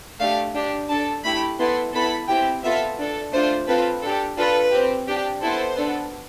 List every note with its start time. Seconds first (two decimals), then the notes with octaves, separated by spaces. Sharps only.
0.19 A3 D4 G4 F5
0.55 D4 G4
0.89 D4 A4 A5
1.24 A3 E4 G4 B5
1.59 B3 E4 A4 C6
1.94 B3 E4 A4 B5
2.28 C4 E4 G4 G5
2.63 B3 F4 A4 E5
2.98 D4 A4
3.33 A3 D4 F4 C5
3.68 C4 F4 A4 B4
4.02 D4 G4 A4
4.37 D4 F4 A4 B4
4.71 C4 G4
5.07 D4 G4
5.42 B3 E4 A4 C5
5.76 B3 D4 A4